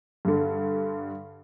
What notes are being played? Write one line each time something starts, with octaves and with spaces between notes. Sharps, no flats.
G2 D3